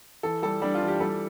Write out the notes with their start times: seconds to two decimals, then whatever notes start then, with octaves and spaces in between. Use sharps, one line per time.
0.23 E3 A4
0.42 G3 A4
0.62 G3 D4
0.74 F4
0.81 E3
0.88 G4
1.00 G3 A4